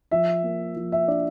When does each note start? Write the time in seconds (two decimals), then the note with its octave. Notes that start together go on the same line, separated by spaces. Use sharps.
0.11 F3 E5
0.43 A#3
0.76 F3
0.92 E5
1.08 D4 D5